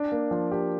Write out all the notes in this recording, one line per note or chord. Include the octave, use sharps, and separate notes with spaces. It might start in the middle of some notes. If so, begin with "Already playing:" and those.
Already playing: D4
A#3
F3
G4